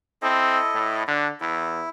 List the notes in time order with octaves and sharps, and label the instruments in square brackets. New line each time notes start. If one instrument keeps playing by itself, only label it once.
[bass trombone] C4 [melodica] E4 A4 D#5
[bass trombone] A2
[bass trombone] D3 [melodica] D4
[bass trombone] E2 [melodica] E4